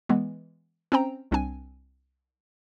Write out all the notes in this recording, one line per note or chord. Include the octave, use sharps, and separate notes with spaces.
E3 G#3 B3
C4 C#4 C5 G5 A#5
C2 C4 D4 G#5